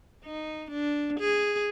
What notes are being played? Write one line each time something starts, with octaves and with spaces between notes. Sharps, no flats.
D#4
D4
G#4